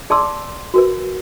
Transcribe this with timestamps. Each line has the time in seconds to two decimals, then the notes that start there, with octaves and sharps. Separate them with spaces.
0.10 G#4 D5 A5 C6 D6 E6
0.74 F#4 A#4 B4